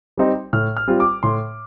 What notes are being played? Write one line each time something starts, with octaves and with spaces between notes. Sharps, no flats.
G3 C4 D#4
A2 F6
F6
G3 C4 F4
D6
A2 C6